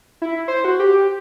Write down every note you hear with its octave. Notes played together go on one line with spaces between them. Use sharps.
E4
C5
F#4
G4